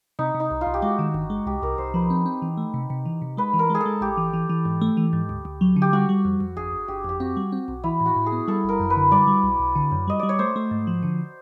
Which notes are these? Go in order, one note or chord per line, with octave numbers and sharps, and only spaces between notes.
C3 D#4
C3
D#4
C2
F4
C2
G4
G#3 F#4
D#3
G1
G#3
C2 G4
C2 A#4
C2 C5
F3 B4
C4
C4
E3
A3
C3
C3
E3
C3
G#3 B4
E3
A#4
G#3 G#4
A4
G#3
A1 G4
E3
E3
E3
G#2
A3
E3
G#2
D2
D2
F#3
D3
G4
G3 F#4
G3
F2
F2
G1 G#4
G1
G1 G4
F2 G4
C4 F#4
G3
C4
B1
E3 E4
A2
F#4
A2
G#4
B3
G3 A4
G1 A#4
F#2
B4
D3
G3 D5
G3
B1
B1
D3
F#2
G3 D#5
G3 D5
C#5
A3 C5
A3
G#2
F3
D3